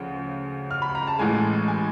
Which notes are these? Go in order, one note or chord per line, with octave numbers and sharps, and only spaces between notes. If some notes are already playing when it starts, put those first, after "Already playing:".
Already playing: D2 C#3 F3
F6
B5
A#5
A5
A1 A2 E3 G#3 G#5
G#5